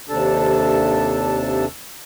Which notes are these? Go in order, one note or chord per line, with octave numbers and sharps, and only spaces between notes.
D#2 C3 D4 A4 A5